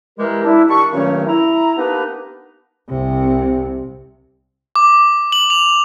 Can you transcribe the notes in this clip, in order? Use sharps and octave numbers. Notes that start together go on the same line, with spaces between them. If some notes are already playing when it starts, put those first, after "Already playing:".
E3 G3 G#3 G4 A#4
D4 E4
D#3 G3 D4 C#6
G2 A#2 D#3 F#3 A3 C#4
E4 A#5
A#3 B3 D4 D#4 G4 B4
C2 C3
D6
F#7
F7